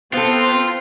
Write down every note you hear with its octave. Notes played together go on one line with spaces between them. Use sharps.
B3 C4 F4 A4